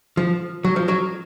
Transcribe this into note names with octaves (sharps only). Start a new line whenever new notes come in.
F3
F#3
F3
F#3